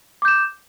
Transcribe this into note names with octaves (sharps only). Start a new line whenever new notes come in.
D6 G6 E7